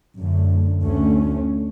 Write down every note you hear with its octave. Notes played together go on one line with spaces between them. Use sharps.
F#2 D3 A3
D2 D3 A3 C#4